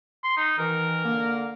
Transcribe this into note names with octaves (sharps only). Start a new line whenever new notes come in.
C6
D#4
B2 D#3 E3 A#4
D3 A#3